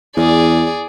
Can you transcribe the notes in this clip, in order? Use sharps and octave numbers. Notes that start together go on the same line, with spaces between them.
E2 G#4 D5